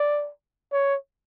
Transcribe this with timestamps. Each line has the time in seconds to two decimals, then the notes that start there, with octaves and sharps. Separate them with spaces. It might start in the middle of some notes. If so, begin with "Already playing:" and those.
Already playing: D5
0.72 C#5